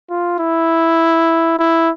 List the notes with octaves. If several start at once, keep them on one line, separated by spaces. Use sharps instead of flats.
F4
E4
E4